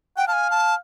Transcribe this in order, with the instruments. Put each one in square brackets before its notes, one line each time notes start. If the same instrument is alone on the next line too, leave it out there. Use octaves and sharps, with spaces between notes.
[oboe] F#5 [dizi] G5
[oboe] F5 [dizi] A5
[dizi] G#5
A5